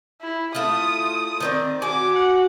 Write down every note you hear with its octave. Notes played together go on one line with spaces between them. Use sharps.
E4
A3 E4 F4 D#6
D#3 C4 D5
F#4 G#5 D6
F#5